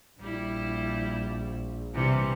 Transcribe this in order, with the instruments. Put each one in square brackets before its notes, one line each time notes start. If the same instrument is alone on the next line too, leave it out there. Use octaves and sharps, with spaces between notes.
[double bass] A#1 [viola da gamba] G3 E4
[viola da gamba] C3 E3 G3